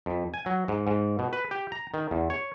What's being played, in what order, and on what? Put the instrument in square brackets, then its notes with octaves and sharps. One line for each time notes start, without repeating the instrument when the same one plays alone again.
[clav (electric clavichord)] F2
G#5
F#3
G#2
G#2
B2
B4
G4
A#5
D#3
E2
C#5